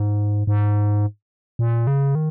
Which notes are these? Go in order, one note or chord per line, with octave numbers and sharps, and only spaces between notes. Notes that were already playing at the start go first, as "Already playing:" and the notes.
Already playing: G#2
G#2
A#2
C#3
D#3